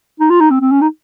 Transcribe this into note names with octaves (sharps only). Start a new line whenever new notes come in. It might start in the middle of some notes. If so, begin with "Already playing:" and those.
D#4
F4
D#4
C4
C4
C#4
D#4